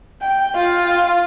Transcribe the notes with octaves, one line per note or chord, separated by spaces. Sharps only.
G5
F4